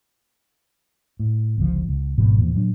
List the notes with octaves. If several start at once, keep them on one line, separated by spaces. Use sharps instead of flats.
A2
G1 C#2 F3
C#2
G#1 G#2 B2 F3
E2 A#2 F3
A#2 F#3 D4